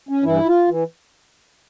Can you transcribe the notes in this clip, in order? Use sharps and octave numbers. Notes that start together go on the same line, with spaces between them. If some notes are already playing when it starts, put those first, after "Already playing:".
C#4
G2 E3 E4
F4
E3